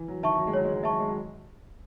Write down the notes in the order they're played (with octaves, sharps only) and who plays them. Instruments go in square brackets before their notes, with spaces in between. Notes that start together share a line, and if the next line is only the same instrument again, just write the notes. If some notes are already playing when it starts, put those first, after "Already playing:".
Already playing: [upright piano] E3
F#3
[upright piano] D#3 [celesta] E5 A5 C#6
[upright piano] F#3
G#3
[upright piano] F#3 [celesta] C#5
[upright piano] G#3
F#3
[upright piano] G#3 [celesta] E5 A5 C#6
[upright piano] F#3
G#3
F#3